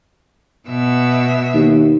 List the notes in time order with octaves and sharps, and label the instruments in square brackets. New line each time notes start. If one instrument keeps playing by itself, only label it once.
[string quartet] B2 E5
[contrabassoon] D#2